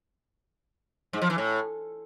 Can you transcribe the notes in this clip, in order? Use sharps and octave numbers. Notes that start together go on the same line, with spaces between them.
G#2
F3
E3
A2